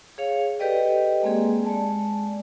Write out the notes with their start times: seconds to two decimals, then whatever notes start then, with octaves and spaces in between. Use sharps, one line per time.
0.18 G#4 C#5 F5
0.59 G4 A4 B4 D5 D#5 G5
1.23 G#3 A#3 C4 G#4
1.65 G#3 D5 A5